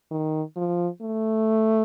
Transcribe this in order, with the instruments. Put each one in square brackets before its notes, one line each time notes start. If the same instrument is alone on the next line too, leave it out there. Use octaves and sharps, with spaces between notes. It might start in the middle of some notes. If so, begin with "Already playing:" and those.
[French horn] D#3
F3
A3